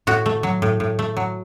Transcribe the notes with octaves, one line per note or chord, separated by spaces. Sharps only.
A2 F#4
A3
F#3
A2
A2
A3
F#3